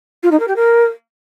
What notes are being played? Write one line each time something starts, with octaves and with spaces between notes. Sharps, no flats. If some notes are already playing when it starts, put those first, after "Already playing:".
F4
D#4
A#4
G4
A#4